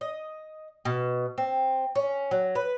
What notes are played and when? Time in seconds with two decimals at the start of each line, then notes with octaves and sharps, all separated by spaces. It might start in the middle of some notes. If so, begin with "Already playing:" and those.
0.01 D#5
0.85 B2
1.38 C4
1.95 C#4
2.31 F#3
2.55 B4